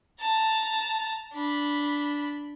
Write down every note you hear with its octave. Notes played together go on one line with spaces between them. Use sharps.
A5 A#5
D4 B5